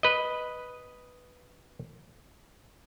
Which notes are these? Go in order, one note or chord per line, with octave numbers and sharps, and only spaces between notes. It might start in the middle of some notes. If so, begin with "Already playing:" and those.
B4 D#5